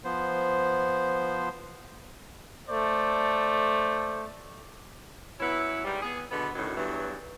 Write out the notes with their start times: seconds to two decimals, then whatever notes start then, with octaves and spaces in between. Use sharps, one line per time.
0.04 F3 B3 C5
2.69 A3 C5 D5
5.40 F#3 B3 C#4 E4
5.85 G#2 G3
6.02 B3 G#4
6.31 B2 D3 G#3 B3
6.54 F#2 A2 D3 D#3 F#3
6.75 E2 G2 E3 F#3